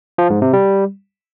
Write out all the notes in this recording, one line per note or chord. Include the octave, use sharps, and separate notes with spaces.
F3
G#2
C3
G3